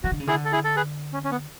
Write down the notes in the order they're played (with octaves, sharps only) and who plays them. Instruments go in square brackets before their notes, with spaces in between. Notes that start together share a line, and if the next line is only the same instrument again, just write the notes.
[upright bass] E3 [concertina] F#4
[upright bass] D3
C#3
[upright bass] D3 [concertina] E4 G#4
[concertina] A4
E4 G#4
A4
G#4 B4
C#4
C#4
B3